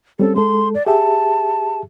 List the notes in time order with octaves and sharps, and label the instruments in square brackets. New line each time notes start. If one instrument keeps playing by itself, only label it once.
[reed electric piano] G3 C4 C#4 [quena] A4
[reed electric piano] G#3 A4 [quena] C6
[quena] D5
[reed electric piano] G4 G#4 E5 [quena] A5